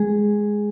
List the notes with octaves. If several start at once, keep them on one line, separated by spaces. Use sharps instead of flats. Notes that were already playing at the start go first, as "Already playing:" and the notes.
Already playing: G#3 G#4